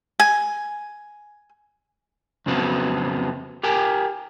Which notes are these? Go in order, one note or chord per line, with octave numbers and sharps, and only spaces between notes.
G#5
F2 C#3 F#3 B3 C4
G4 A#4 G5 G#5